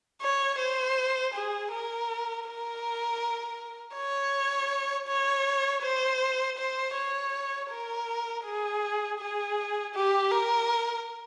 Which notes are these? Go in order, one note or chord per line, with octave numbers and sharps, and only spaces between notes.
C#5
C5
G#4
A#4
A#4
C#5
C#5
C5
C5
C#5
A#4
G#4
G#4
G4
A#4